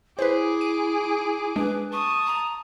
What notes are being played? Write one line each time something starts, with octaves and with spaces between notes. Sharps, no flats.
E4 G#4 B4 C5 D6
D#7
G#3 D4 B4
A5 C#6 D#6
A#5